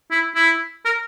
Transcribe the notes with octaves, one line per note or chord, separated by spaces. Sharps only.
E4
E4
A#4